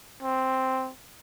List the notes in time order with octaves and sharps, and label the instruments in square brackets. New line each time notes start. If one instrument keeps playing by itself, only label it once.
[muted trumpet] C4